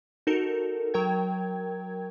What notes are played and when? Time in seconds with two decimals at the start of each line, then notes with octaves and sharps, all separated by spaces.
0.27 D#4 F#4 A4 A#4
0.94 F#3 A#4 G5 G#6